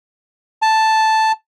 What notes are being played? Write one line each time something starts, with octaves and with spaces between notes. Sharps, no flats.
A5